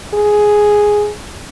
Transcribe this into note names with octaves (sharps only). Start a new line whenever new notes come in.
G#4